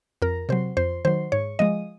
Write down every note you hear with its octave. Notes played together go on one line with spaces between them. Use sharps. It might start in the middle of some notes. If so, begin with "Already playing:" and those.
F2 A#4
C3 F#3 C5
F2 C5
D#3 F#3 C5
G#2 C#5
F3 G#3 D#5